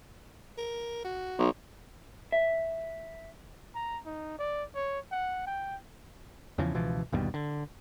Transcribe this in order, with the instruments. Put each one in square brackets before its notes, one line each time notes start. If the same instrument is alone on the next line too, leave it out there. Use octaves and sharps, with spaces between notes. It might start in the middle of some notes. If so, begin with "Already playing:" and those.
[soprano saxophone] A#4
F#4
[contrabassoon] B1
[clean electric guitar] E5
[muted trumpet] A#5
D#4
D5
C#5
F#5
G5
[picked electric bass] E2 C#3 E3 F3
C#2 B2 E3 F3
G1 D#2 B2 G3
D3